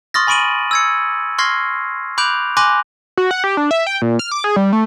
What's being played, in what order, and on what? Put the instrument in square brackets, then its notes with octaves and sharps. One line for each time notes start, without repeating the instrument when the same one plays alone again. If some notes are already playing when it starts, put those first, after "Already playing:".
[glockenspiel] C6 C#6 D#6 F6 A6 A#6
G#5 B5 C#6 D7 D#7 F#7
E6 G#6 C#7
C6 C#6 F6 G#6 A#6 C7
B5 D6 F#6 G6 D7 F7
G#5 B5 C6 D6 F#6 A#6
[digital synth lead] F#4
F#5
G4
D4
E5
G5
A#2
F6
D6
G#4
G3
A3